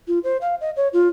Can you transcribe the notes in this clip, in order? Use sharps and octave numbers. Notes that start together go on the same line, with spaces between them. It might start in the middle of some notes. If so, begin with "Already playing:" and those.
F4
C5
F5
D#5
C#5
F4